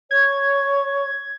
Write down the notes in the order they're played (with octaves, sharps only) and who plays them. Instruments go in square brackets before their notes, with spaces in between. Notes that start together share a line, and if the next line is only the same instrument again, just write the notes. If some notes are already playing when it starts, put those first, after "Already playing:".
[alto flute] C#5 [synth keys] G#6